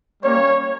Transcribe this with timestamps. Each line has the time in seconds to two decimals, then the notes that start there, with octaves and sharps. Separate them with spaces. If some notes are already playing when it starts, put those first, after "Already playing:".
0.22 G3 A#3 C#4 C#5